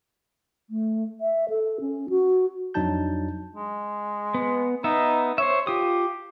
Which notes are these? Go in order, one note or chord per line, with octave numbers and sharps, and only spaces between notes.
A3
E5
A4
C#4
F#4
F2 F#3 D4 D#4 A5 G6
G#3
B3
B3 D#4 E5
C5 C#5 E5
F4 G4 D#6